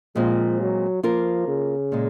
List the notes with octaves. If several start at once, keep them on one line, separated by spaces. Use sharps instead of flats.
A#2 F3 G#3 C4
F#3
F3 A#3 F4 A#4
C#3
A#2 G#3